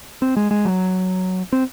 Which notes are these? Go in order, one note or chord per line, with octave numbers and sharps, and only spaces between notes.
C4
G#3
G#3
F#3
C4